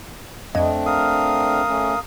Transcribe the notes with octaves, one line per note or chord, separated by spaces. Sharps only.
F2 A3 C4 D4 D#5
A#4 F5 D#6
A3 C#4